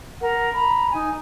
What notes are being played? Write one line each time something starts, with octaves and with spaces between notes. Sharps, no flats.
A#4 F#5
A#5 B5
D#4 G#5